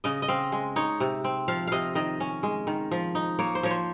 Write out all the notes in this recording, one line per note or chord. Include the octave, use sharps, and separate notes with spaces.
C#3 D#5
D#5
C4 F5
G#3
D#4 C#5
C3
C4
F3 F5
C3 D#5 F5
D#3 D#5
C#4
G#3
D#3
F3
D#4
A#3 C#5
C5
F3 C#5
C5